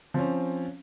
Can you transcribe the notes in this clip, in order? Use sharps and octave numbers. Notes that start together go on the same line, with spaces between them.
F3 C4 C#4